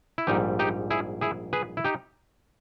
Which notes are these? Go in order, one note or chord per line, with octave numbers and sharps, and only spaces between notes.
E4
A#1 G#2 G3 D#4 G4
D#4 G4
E4 G#4
E4 G#4
G#4 B4
E4
D#4 G4